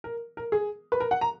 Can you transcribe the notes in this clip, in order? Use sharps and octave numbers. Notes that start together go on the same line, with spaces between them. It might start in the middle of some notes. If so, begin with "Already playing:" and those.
A#4
A#4
G#4
B4
A#4
F#5
A#5